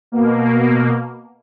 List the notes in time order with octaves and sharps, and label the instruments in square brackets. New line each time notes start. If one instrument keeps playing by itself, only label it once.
[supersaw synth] B2 A#3